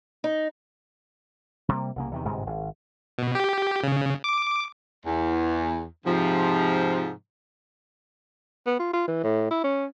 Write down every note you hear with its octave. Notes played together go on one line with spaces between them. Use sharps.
D#4
C3 G3 A#3
C2 C#3 A#3
E2 C3 D#3
G1 G#2 C3 G#3
G#1
B2
G4
C#3
D6
E2
G#2 C3 F3
B3
F4
F4
E3
A2
E4
C#4